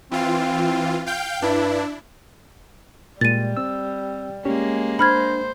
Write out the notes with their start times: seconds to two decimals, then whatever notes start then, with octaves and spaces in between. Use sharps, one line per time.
0.11 E3 C4 F4
1.06 F5 G5 G6
1.42 G2 D4 E4
3.21 A#2 G3 G#3 A6 D#7
3.57 C4 E6
4.45 G#3 A#3 C#4 G4 C#5
4.99 D4 C5 B5 F6 G#6